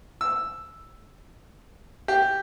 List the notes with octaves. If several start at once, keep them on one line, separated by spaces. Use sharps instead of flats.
E6
G4